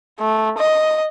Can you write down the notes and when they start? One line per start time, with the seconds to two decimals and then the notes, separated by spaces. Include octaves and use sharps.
0.20 A3
0.58 D#5